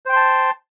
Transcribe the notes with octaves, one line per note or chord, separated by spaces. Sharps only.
C5 G5 A5 C6